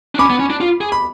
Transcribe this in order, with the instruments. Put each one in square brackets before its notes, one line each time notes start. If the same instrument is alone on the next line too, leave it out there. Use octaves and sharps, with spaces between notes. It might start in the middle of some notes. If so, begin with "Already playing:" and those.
[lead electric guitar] D4
[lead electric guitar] C#4 [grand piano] B5 D6
[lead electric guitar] B3
C#4
D4
F4
G#4
[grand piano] B5